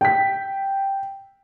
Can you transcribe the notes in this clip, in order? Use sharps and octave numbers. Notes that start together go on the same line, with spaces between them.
G5 B6